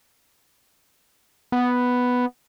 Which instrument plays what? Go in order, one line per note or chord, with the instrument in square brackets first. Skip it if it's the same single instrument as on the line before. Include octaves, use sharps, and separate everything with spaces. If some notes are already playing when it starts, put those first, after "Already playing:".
[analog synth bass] B3